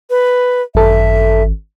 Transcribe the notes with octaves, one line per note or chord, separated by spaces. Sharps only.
B4
G#1 F#2 A4 E5